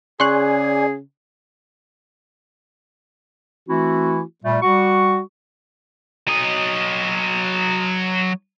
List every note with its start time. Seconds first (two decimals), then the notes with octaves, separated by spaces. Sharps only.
0.20 C#3 G#4 D5 G#5 C6 C#6 F#6
3.68 E3 A3 C4 E4 F#4
4.43 A#2 G3 A3
4.62 G3 F#4 C#6
6.27 F#3 D#5